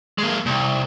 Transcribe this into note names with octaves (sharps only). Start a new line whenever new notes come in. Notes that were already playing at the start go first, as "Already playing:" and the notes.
G#3 A#3
C2